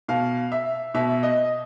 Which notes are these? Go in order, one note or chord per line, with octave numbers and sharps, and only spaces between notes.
B2 F5
E5
B2 E5
D#5